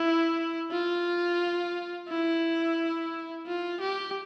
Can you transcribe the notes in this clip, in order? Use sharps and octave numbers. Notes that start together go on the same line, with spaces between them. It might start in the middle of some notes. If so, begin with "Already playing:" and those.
Already playing: E4
F4
E4
F4
G4